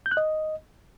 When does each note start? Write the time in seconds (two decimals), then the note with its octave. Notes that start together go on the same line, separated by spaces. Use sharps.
0.06 G6
0.11 F#6
0.17 D#5